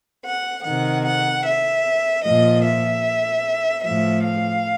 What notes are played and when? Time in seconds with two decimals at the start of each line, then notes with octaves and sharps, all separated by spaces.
0.26 F#5
0.65 C3 D#3 F#5
1.05 F#5
1.45 E5
2.24 A#2 F3 D#5
2.64 E5
3.83 A2 F3 E5
4.23 F5